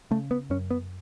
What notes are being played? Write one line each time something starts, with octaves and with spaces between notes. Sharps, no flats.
C#3 A3
B3
F#2 C#4
B3